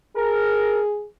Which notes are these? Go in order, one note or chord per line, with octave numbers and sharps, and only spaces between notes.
G#4 A#4